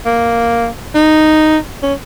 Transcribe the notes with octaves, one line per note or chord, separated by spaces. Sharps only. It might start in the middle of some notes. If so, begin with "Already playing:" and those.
A#3
D#4
C#4